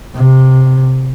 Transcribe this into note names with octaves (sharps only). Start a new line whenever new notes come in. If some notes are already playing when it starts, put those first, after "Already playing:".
C3